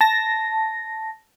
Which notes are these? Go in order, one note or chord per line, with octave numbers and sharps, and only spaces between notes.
A5 A#6